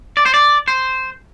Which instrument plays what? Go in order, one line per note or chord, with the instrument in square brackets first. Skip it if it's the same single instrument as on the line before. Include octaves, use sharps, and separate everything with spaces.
[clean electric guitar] D5
C5
D5
C5